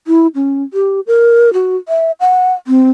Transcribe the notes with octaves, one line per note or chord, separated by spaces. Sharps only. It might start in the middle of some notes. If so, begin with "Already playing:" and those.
E4
C#4
G4
A#4
F#4
E5
F#5
C4